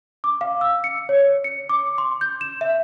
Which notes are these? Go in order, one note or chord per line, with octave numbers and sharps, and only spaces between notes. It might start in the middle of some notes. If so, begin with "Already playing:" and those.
D6
F5
E6
C#7
C#5
C#7
D6
C6
G6
E7
E5